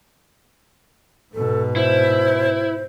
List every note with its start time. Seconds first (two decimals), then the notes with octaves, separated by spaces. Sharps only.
1.34 G#2 B2 A4
1.76 E4 C5